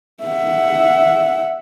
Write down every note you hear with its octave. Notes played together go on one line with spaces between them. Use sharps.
E5 F#5